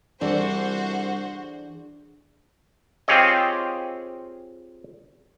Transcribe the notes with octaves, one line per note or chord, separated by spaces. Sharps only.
C2 E3 D4 F#4 G#4 A4 C5 D5
C4 F4 G4 G#4 C#5 D#5